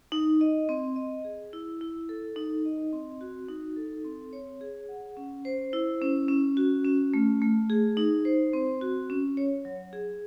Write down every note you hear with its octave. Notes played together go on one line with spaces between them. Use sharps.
D#4
D#5
C4
D#5
G#4
E4
E4
A4
D#4
D#5
C4
F#4
D#4
A4
C4
C#5
G#4
F#5
C#4
C5
E4
C#4
C#4
F#4
C#4
A3
A3
G#4
D#4
C5
C4
F#4
C#4
C#5
F#3
G#4